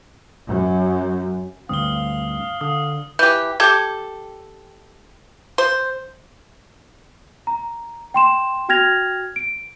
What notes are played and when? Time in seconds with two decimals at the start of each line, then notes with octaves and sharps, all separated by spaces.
0.48 F#2
1.69 D2 G2 C4 F5 D#6 G7
2.61 D3 D#6
3.19 E3 G4 G6
3.60 G4 A4 D6 G6 G#6
5.58 C5
7.47 A#5
8.14 G5 C6 E7
8.69 F#4 G5 F6 G#6 A#6 F7
9.36 D7